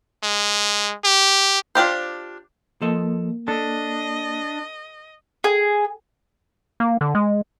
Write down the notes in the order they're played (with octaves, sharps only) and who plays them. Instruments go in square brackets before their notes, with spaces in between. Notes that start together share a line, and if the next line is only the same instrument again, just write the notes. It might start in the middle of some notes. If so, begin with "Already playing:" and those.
[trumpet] G#3
G4
[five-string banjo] D4 F4 G4 C5
[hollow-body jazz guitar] F3 A4 D#5 [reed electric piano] A#3
[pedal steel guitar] D4 [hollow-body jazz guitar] A4 [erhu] D#5
[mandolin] G#4
[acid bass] A#3
D3
G#3